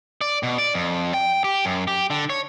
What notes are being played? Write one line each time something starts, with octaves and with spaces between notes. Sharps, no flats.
D5
B2
D5
F2
G5
G4
F#2
G4
D3
C#5